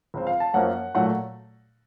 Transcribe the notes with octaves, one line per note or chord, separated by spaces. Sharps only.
C#2 C#3 F3 C4
F5
A5
F#2 F3 A#3 C#4 F#5
A#2 F#3 A3 F#5